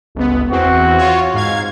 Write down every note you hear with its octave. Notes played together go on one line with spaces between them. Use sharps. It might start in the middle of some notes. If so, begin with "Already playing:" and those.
G1 C#2 B3
E2 E3 C4 F#4
F4 C#5
G#2 F5 G#6